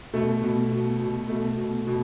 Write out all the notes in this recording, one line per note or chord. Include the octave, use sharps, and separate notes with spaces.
B2 A3
B2
B2
B2
B2 A3
B2
B2